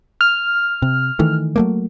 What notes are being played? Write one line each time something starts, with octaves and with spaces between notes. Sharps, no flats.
F6
C3
D#3 E3 A3
F#3 A3 A#3